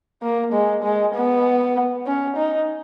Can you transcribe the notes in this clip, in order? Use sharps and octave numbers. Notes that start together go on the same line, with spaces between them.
A#3
G#3
G#3
B3
C#4
D#4